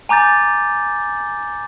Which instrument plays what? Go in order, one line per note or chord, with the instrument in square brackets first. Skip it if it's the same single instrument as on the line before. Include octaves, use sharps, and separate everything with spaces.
[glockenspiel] G#5 A#5 D6 G6 A6